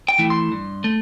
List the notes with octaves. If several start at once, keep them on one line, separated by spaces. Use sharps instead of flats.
G5
E3 A3 E4
C6
G2
A3